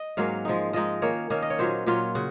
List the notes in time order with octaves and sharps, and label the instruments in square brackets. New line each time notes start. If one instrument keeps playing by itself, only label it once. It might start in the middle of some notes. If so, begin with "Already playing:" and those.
Already playing: [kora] D#5
G#2 F#3 A#3 C#4 F5
F3 G#3 D#4
F3 G#3 D#4 D#5
D#3 A#3 C#4 C#5
D#3 A#3 C#4
D#5
C#5
A#2 F#3 C#4 C5
A#2 F#3 C#4 F4
C#3 F#4